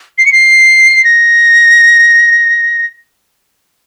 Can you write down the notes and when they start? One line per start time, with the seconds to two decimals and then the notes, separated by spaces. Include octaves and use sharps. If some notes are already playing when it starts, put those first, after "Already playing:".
0.18 C7
0.26 C#7
0.32 C7
1.04 A#6